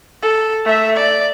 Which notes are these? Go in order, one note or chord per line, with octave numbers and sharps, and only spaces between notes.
A4
A3 E5
D5